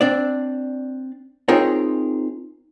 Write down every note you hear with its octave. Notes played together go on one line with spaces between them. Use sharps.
C4 D4 D5
C4 D#4 F4 G#4 A#4 C#5